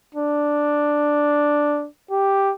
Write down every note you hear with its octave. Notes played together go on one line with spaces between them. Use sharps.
D4
G4